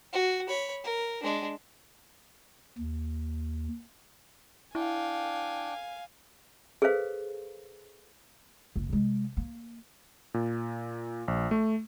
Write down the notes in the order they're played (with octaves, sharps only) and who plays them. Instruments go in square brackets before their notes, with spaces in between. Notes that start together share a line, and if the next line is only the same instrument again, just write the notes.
[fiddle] F#4
C#5 B5
A#4
G#3 D4
[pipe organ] D#2
[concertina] D4 G5 [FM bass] E4 [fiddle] F5 G#5
[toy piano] G#4 A4 B4 C5 F5
[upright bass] F#1
C3 G#3
A#3
[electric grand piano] A#2
A#1
A3